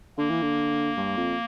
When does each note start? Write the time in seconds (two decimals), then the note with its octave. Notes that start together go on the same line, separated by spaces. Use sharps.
0.18 D3 A#3
0.30 E3
0.42 D3
0.97 G2
1.17 F2